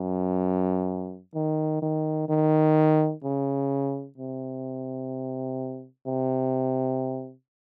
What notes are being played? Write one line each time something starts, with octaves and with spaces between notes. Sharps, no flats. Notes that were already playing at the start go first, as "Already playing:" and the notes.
Already playing: F#2
D#3
D#3
D#3
C#3
C3
C3